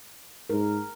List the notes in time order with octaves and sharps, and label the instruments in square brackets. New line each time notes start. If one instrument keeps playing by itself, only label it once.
[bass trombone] G#2 [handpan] A#4